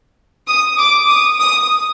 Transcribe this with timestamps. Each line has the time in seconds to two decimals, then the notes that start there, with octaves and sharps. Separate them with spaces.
0.48 D#6
0.79 D6
1.09 D#6
1.40 D#6